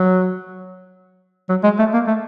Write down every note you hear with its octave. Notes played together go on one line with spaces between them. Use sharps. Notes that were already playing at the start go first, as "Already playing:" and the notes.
Already playing: F#3
F#3
G#3
A3
A#3
A3